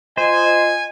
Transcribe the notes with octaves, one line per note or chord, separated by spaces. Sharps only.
F4 C5 D#5 G#5